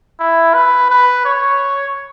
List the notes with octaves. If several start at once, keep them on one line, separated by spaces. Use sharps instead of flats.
E4
B4
B4
C#5